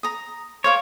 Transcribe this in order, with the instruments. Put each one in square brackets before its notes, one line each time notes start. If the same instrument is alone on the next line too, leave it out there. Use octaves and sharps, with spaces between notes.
[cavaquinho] A#5 D#6
[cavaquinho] C5 F5 D6 [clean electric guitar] C#5